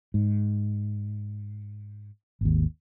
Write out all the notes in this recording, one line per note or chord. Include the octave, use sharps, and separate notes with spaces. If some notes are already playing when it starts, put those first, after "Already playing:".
G#2
G#1 D#2